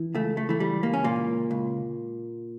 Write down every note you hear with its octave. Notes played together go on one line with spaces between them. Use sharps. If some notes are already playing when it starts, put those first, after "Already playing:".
Already playing: E3
C#2 A3
A3
E3 A3
G3
C#2 A#3
C#4
A#2 A#3
C#2
C#2